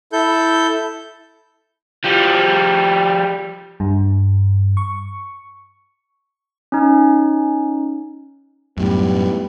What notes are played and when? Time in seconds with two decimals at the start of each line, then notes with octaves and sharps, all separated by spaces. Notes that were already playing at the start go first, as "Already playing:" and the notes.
0.13 E4 A4 G6
2.04 F3 G3
3.80 G2
4.77 C#6
6.72 C#4 D#4
8.77 F#2 A2 G3 B3